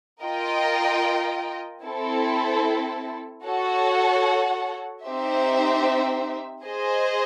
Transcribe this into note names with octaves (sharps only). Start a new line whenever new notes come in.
F4 A#4 D#5 G5
C4 E4 A4
F#4 A4 C#5 F#5
C4 D#4 G4 C5 E5
G#4 C5 D#5